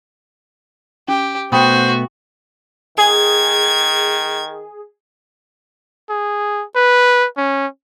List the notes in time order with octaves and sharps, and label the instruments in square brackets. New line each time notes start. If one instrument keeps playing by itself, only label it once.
[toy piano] C#4 [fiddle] G4
[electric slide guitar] B2 A3 B3 [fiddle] F#4 [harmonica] C5 [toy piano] G5 B5 D#6
[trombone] D#3 [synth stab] G#4 [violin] G#6
[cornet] G#4
B4
C#4